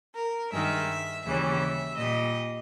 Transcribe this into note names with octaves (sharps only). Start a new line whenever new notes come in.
A#4
G2 D#3 G#3 E5
D#2 C#3 E3 G3 E5
A#2 G3 D#5